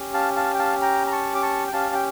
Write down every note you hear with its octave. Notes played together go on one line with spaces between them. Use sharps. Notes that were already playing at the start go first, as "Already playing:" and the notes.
Already playing: C#4 G4
F5 A5
F5 A5
G5
F5 A5
G5 A#5
A#5
A5 C#6
D6
A5 C#6
G5
C#4 G4 F5 A5
G5